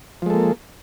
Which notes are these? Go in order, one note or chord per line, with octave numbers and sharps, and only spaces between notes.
F3 G#3 A#3 A4